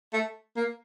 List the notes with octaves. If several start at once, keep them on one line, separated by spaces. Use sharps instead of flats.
A3
A#3